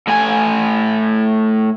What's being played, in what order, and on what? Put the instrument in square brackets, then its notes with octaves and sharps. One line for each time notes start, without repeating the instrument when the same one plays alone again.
[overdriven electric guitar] A2 G#5